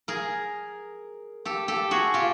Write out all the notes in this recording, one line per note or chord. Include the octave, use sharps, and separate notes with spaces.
G#4 A#4
G4 A4
G4 A4
F#4 G#4
F4 G4